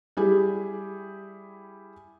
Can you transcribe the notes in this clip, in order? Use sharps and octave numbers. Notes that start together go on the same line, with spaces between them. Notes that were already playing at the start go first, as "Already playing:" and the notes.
G3 E4 G4 G#4